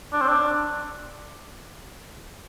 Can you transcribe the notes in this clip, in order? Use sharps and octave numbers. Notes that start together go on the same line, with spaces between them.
D4
C4
D4